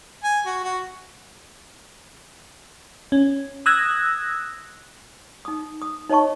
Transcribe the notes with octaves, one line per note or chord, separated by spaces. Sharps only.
G#5
F#4
F#4
C#4
D#6 E6 F#6 G#6 A#6
D#4 D#6
D#6
D#4 C#5 D#5 A5 C#6